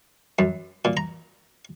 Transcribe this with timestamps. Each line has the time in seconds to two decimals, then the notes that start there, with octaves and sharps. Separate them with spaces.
0.39 F#2
0.85 A#2
0.97 A#5